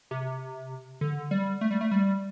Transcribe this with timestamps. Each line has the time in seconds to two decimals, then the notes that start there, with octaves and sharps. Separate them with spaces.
0.11 C3
1.01 D3
1.31 G3
1.61 A3
1.71 G3
1.81 A3
1.91 G3